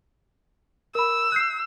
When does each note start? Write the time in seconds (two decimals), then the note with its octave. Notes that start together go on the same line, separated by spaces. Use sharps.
0.95 A#4 B5 E6
1.32 F#6 G6 C7